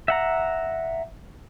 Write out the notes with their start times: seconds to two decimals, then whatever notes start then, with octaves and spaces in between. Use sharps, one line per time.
0.08 E5 F#5 A#5